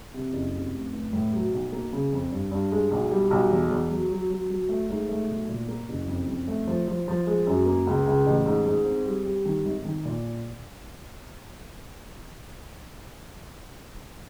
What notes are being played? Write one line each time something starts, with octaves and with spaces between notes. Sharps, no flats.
C3
F#1
C3
F1
F1
A2
F#3
B1
A#3
C#3
F2
G2
G2
G#3
B1
G3
B1
E2
E2
F#3
F#3
F#3
F#3
A3
G#2
A3
B1
A#2
A#3
F#1
F2
F2
A3
F3
F3
F3
G#3
F#2
A#3
C#2
C#2
A1
G#2
G#2
C4
G3
G3
D#3
G#1
D#3
A#2